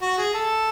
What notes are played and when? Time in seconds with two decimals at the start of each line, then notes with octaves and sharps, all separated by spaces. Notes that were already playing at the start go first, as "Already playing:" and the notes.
0.02 F#4
0.18 G#4
0.34 A4